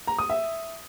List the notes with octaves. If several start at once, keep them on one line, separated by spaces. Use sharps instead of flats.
A#5
D#6
E5